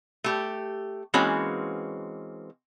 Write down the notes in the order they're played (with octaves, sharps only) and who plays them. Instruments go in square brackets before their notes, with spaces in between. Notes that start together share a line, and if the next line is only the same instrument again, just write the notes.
[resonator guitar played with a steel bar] A3 G4
E3 G#3 A#3 C4 C#4 F#4